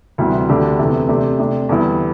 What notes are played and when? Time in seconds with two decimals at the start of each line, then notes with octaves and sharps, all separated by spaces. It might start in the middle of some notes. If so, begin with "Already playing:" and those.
0.18 D2 C3 E3 G3
0.49 D2 D3 A3 D4 G4
0.79 E2 C3 E3 A3
1.09 C3 A3 D4 G4
1.39 C3 A3 D4
1.69 E2 D3 G3 E4